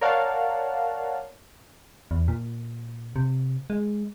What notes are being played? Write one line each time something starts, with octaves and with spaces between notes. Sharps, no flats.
A#4 C#5 D5 F5 F#5 A5
E2
A#2
C3
G#3